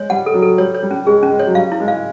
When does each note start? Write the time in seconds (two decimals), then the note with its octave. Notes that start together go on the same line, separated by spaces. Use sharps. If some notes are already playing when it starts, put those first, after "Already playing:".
Already playing: G#3 C#5
0.10 G3 F#5
0.26 A4
0.34 F#3
0.42 A4
0.58 G3 C#5
0.75 C#5
0.83 G3
0.91 C#4
1.07 G#3 G#4
1.23 C#4
1.31 G#3
1.39 C#5
1.47 F#3
1.55 G3 F5
1.72 E4
1.80 G#3
1.88 F5